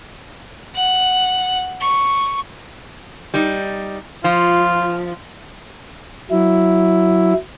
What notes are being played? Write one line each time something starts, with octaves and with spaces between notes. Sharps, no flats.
F#5
C#6
G3 D#4
F3 F4
F#3 E4